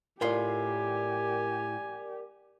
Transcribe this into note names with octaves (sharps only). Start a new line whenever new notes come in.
A2 F4 G4 A#4 D5 F5 G#5